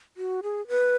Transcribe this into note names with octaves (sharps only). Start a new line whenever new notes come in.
F#4
G#4
B4